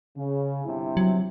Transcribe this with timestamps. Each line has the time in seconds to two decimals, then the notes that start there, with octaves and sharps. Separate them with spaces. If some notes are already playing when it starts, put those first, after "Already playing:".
0.17 C#3
0.65 G1 C3 E4
0.97 F#3